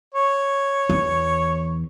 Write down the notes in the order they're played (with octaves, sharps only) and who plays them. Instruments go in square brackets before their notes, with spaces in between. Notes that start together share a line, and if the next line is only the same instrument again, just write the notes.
[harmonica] C#5
[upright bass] E2